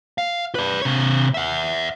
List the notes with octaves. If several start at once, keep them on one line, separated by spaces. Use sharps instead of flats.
F5
B4 D5
C3 C#5
E5 F#5